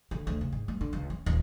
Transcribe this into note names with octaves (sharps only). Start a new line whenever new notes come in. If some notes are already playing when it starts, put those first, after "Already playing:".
D3
D2
C#3
G#2
G2
D3
C#2
C#4
D#1